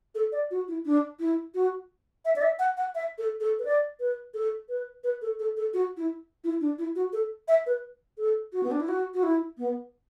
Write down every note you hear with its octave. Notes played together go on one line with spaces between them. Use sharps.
A4
D5
F#4
E4
D4
E4
F#4
E5
D5
E5
F#5
F#5
E5
A4
A4
B4
D5
B4
A4
B4
B4
A4
A4
A4
F#4
E4
E4
D4
E4
F#4
A4
E5
B4
A4
F#4
B3
D4
E4
F#4
F#4
E4
B3